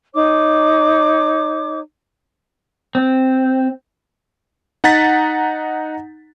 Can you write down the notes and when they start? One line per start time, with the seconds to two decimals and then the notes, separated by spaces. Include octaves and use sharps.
0.14 D#4 C#5 D6
2.95 C4
4.84 D#4 F#5 A#5 A6 B6